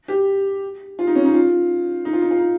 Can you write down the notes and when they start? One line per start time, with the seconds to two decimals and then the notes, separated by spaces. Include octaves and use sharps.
0.08 G4
0.99 F4
1.07 D#4
1.15 C#4
1.25 D#4
1.34 F4
2.05 D#4
2.13 F4
2.22 D#4
2.31 F4
2.39 D#4